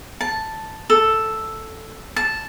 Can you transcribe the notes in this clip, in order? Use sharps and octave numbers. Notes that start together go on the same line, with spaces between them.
A5
A4
A5